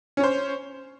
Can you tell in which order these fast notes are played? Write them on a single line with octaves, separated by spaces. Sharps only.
C#4 C#5 C5